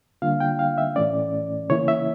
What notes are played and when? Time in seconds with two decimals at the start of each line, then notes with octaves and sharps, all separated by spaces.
0.22 D3 G3 A#3 D4 F4 F5
0.40 G5
0.59 F5
0.78 E5
0.96 A2 E3 A3 C#4 D5
1.70 C#3 E3 A#3 E4 C#5
1.88 E5